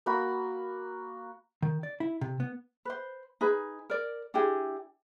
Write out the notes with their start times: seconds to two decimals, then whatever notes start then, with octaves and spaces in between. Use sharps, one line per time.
0.06 A#3 F#4 B5
1.62 D#3
1.83 D5
2.00 E4
2.21 C3
2.40 B3
2.85 B4 C5
3.41 D#4 G#4 B4
3.90 A#4 D5
4.34 D4 E4 G4 G#4